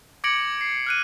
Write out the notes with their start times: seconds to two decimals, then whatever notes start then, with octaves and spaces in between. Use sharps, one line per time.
0.24 D6 G#6 A#6 C#7 D7 F#7
0.61 C7
0.87 F6 F#6 D#7